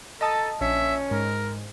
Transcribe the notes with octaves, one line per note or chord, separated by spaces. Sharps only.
A4 D#5 A5 A#5 D#6 A6
A#1 C#4 E5
G#2 A#4